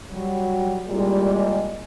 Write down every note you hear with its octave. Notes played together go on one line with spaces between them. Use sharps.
F#3 G3
C2 A#2 G3 G#3